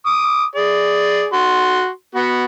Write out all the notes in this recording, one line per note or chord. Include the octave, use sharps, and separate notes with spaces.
D6 D#6
G#4 D5
F#4 C6
B3 F#4